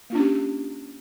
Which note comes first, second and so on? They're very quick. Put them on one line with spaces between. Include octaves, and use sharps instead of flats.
A#3 F4 D4 C#4 G4